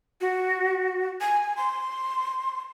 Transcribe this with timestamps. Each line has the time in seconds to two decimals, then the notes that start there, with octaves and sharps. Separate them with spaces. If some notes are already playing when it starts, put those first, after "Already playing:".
0.21 F#4
1.20 G#5
1.57 C6